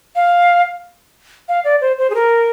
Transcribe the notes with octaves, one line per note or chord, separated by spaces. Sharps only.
F5
F5
D5
C5
C5
G#4
A#4